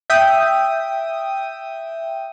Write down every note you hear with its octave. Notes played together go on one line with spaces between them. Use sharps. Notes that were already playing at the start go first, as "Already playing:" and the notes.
E5 G5 D#6